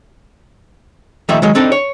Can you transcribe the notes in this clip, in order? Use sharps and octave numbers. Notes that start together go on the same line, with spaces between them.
D#2 F3 A3 D#4 E5
D#3 F#3 G#3
C4 D4 D#4 A4
C#5